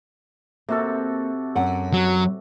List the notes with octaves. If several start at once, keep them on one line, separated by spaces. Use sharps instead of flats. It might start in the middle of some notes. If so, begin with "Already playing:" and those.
C3 A#3 F#4 A4
F#2 F#5
F#3